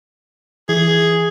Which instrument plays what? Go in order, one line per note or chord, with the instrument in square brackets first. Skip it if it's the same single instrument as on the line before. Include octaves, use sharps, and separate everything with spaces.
[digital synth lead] E3 [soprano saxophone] G#4